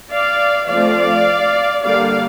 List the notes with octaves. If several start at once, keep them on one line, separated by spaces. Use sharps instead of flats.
D5 F5
F3 A3 C4 D5 F5
D3 G3 A#3 D5 F5